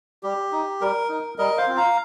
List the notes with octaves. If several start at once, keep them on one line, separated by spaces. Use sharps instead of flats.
G3 G4
D#4
G3 A#4
D#4
G3 A#4 D#5
C5 F5
C4 F4
F5 A#5